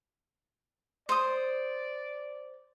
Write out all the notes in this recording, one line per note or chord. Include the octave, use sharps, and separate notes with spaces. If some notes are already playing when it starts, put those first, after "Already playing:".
C5 D5 D#6